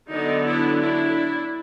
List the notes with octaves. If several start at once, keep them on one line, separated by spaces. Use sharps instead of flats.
D3 F#3 B3 D4 D#4
D4 E4
D4 E4